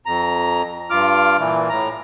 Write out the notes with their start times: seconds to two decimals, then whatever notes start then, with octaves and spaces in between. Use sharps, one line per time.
0.06 F2 A#5
0.90 G2 F4 D6 F6
1.37 A#2 E3
1.69 A2 A#5